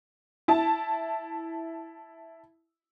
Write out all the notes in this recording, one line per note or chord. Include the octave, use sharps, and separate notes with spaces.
E4 A5